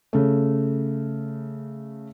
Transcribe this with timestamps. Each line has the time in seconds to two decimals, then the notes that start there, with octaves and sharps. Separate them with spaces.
0.13 C#3 A3